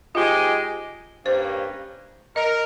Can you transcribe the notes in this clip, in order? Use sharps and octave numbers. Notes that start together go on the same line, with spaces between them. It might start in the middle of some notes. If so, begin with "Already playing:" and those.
G#3 D#4 F4 G4 C5 D#5
G2 G3 A#3 C#4 C5
A#4 D#5